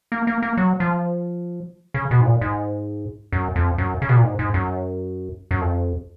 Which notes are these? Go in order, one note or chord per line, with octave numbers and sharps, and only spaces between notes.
A#3
A#3
A#3
F#3
F3
C#3
B2
G#2
A#2
G#2
F#2
F2
F#2
C#3
B2
A#2
G#2
G#2
F#2
F#2
F2